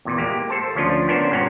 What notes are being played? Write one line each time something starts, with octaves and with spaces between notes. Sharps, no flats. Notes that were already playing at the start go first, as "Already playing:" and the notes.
E2 A#2 E3
G#3 A#3 G4
A4 C5 A5
D2 F3 C#4 D4 F4
B3 C#4 D4 A#4 C5
G2 A#2 C#4 F#5 A#5